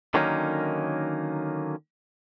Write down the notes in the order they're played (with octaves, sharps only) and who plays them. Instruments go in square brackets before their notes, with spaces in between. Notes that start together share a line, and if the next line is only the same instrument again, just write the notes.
[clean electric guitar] D3 D#3 F#3 A#3 C#4 D#4